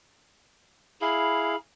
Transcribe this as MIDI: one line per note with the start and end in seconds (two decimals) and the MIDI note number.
1.02 1.56 64
1.02 1.56 68
1.02 1.56 77
1.02 1.57 83